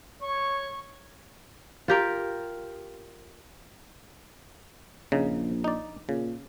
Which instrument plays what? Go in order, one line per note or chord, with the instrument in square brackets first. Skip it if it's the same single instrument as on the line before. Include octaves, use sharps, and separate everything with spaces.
[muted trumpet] C#5 [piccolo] C#6
[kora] F4 G4 A#4
[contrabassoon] A#1 [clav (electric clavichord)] C#3 D#4
[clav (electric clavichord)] D#4 D5
[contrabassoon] A#2 [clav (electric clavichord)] C#3